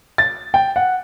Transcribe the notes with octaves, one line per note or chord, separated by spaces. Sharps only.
A6
G5
F#5